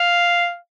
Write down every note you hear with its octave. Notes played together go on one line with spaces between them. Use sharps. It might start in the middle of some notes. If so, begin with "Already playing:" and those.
Already playing: F5